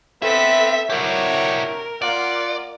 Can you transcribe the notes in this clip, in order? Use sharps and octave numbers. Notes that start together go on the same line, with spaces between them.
B3 C4 A4 B4 E5 B6
D4 E4 F#4 G4 A#4 C#5
A#3 F4 D5 F#5